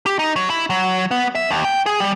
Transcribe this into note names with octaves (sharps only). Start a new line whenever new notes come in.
G4
D#4
F#3
E4
F#3
B3
E5
D#2
G5
G#4
G3